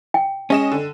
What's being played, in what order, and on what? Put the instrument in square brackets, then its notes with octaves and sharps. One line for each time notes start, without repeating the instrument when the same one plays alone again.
[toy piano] G5
[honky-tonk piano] G#3 D#5 E7 [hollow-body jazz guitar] C#4
[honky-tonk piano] D3